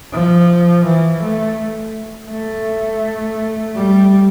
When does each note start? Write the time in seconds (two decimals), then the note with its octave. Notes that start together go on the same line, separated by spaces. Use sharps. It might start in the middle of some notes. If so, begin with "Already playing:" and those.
0.12 F3
0.85 E3
1.22 A3
2.30 A3
3.76 G3